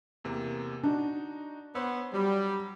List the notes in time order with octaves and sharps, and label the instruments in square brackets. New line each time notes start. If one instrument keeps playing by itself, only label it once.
[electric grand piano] E2 C3 A#3
[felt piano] D4 [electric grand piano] D#4 F#4
[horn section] B3 C5 [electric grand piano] C#5 E6
[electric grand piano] F#3 B5 [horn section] G3